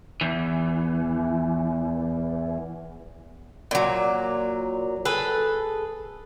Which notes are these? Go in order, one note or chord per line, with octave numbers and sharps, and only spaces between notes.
E2 E3
A#2 F#3
G#4 A4 B4